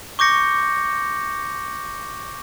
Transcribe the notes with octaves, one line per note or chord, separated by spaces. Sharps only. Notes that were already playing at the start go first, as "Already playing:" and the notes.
C#6 D6 G6 A#6 C#7